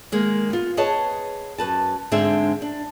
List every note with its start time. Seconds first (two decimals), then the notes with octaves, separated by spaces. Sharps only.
0.12 D#3 G#3 A#3
0.50 B3 F4
0.77 G#4 B4 C#5 D#5 F#5 A5
1.58 F#2 B4 A5
2.12 G#2 D3 G#3 C4 D4 E5
2.62 D4